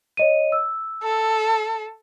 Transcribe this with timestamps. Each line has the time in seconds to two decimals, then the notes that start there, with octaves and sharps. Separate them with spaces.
0.17 C#5 D#5 D#7
0.52 E6
1.03 A4